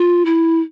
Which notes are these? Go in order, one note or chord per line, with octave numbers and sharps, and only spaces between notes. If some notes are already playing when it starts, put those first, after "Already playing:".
Already playing: F4
E4